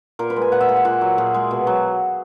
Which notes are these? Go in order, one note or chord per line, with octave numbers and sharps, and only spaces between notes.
A#2 A#4
B4
G#3
G#5
A#2 F#5
E5
G#3 F#5
G#5
A#2 F#5
F#3
A#2 G#4
G#3
B2
F#3